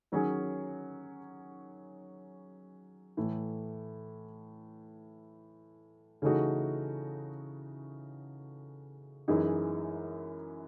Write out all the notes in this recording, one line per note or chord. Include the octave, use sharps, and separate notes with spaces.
D#3 F#3 C#4 G#4
A2 E3 A3
C#3 E3 A3 D#4 F#4
F#2 E3 G#3 D#4